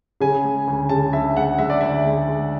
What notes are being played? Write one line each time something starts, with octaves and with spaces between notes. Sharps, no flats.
C#3 G#5
G#3
D2
C#3 A5
D2 E5
G#3 F#5
G#3 E5
D5
D2 E5
G#3
G#3